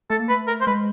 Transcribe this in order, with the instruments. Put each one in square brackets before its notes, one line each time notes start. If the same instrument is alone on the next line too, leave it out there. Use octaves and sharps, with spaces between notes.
[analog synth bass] A3 [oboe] A4
[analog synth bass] A#3
[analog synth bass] A3 [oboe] B4
[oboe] A#4
C5
[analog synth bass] G#3 [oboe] B4